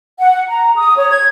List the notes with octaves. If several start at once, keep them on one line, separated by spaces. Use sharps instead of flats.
F#5
A#5
D#6
C#5
G#6